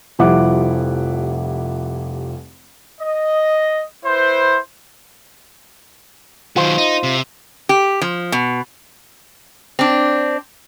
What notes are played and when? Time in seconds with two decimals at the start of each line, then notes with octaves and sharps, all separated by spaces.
0.19 F1 F3 G3 E4 F#5 D6
3.01 D#5
4.05 E4 B4 C5
6.56 D#3 F#3 F4 C5
6.78 D#4
7.03 C3
7.69 G4
8.01 F3
8.32 B2
9.79 C4 D4